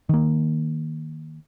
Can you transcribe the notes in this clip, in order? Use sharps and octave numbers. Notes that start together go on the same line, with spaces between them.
D#3 A#3